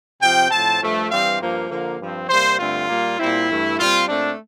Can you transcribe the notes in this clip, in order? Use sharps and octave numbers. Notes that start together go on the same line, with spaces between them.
C3 F3 C4 G5
A2 F3 C4 A5
G2 F3 A3
G2 E3 G3 C4 F5
G2 F3 A#3
D3 F3 A#3
G2 F3 C4
C3 G3 A#3 C5
G2 D3 A3 C4 F4
A#2 G3 A#3
A#2 G3 C4 E4
G2 E3 A3
A#2 G3 C4 F4
A#2 A3 C4 D4